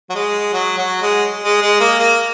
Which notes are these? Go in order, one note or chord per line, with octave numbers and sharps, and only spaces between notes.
F#3
G#3
F#3
F#3
G#3
G#3
G#3
A#3
A#3